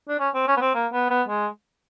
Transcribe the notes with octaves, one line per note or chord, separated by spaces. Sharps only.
D4
C#4
C4
C#4
B3
C4
A#3
B3
B3
G#3